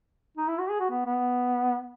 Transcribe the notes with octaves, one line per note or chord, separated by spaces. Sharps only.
D#4
E4
F#4
G#4
F#4
B3
B3